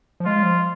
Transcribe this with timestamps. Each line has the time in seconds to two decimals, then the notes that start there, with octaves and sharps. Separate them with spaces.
0.20 F3
0.25 G#3 F4
0.36 G#3
0.43 F3